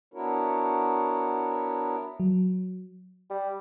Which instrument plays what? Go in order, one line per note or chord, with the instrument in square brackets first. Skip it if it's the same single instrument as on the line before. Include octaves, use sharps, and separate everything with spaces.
[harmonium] B3 D4 E4 F#4 A#4 C#5
[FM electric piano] F#3
[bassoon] G3